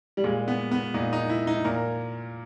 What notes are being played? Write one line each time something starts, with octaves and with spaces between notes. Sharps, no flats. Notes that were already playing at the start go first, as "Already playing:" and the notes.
G3
A#2 G#3
B3
B3
A#2 D#4
D#4
E4
D#4
A#2 A#4